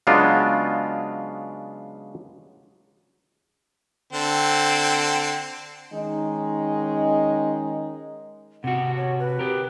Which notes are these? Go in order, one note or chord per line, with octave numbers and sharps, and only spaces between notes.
C#3 F#3 G#3 B3 D4 F4
D3 C4
D#3 G#3 C#4 D#4
C3 F#4 F#5
C#5
B4
G4 A#4